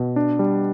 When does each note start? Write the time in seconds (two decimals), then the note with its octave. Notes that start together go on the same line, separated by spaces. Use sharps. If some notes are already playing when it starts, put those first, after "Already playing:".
Already playing: B2
0.16 D4
0.39 G3